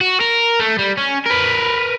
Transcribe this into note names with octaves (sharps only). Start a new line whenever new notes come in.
F#4
A#4
A3
G3
C#4
A#4 B4